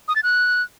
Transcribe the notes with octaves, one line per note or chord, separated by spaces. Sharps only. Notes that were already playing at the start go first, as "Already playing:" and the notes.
D#6
A6
F#6